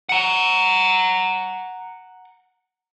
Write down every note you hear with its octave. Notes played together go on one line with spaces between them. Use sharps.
F#5 A#5